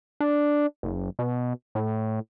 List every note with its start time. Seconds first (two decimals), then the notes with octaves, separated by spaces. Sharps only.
0.20 D4
0.83 F#1
1.19 B2
1.75 A2